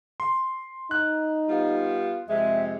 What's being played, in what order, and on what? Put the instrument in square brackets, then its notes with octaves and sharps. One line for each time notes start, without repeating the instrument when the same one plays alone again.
[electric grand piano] C6
[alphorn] D#4 [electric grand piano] F#6
[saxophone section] G3 B3 F4
[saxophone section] F2 C3 G#3 [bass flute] E5